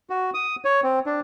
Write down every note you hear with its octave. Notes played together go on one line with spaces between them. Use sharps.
F#4
D#6
C#5
C4
D4